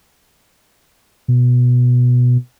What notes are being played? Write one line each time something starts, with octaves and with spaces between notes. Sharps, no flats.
B2